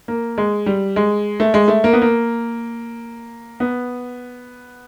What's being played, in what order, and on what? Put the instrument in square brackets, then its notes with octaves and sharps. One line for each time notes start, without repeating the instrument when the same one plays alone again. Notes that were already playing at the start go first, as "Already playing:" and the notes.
[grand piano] A#3
G#3
G3
G#3
A3
G#3
A3
A#3
B3
A#3
B3